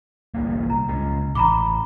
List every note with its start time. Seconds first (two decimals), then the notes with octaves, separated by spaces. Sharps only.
0.34 G1 C2 A#3
0.70 A#5
0.88 C#2 C#3 G#3
1.35 A1 A#5 B5 D6